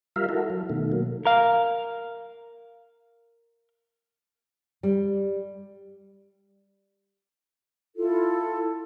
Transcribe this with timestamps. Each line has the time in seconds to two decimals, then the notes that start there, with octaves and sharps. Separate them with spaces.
0.16 G3 F4 A#4 E5 F5
0.29 E4 F#4 A4 A#4
0.50 F#3
0.69 B2 D#3 A3
0.92 F#3 A#3
1.25 A#4 F5
4.83 G3
7.96 E4 F4 A4